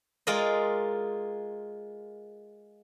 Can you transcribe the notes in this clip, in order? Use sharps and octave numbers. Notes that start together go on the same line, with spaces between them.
G#3 F4 A#4 D5 D#5